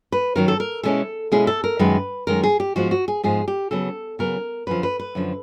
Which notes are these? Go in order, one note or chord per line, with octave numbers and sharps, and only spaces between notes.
B4
F#2 D#3 F#3 A#4
A4
A#4
B2 G#3 C#4 E4 A4
B2 G#3 C#4 E4 G#4
A4
A#4
F#2 D#3 G#3 B4
F#2 D#3 G#3 A#4
G#4
G4
G#2 F3 G#3 B3 F#4
F#4
G#4
G#2 F3 G#3 B3 G#4
G4
C#3 F#3 B3 A4
C#3 F#3 B3 A#4
F#2 D3 F3 B4
B4
B4
F#2 D3 F3